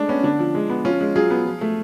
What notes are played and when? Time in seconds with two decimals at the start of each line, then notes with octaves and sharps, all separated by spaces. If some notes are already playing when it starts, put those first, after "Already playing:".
Already playing: G#3 A3 D4
0.08 B3 C#4
0.23 D3 D4
0.39 F3
0.55 G#3
0.69 B3
0.85 F3 C#4 F4
1.01 G#3
1.15 F#3 F4 G#4
1.30 B3
1.46 F3
1.61 A3